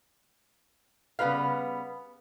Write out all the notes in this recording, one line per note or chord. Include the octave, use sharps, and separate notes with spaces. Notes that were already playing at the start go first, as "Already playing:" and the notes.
C#3 G3 B3 F#4 B4 F5